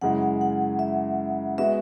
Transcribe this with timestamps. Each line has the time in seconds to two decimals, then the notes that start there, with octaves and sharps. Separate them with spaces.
0.01 F#2 C#3 G#3 E4 F#5
0.41 F#5
0.79 E5
1.58 G#3 B3 F#4 B4 E5